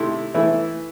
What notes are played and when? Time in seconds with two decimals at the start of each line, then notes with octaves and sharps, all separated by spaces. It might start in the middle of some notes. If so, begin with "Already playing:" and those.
Already playing: C3 D#3 A3 E4
0.34 E3 A3 E4 B4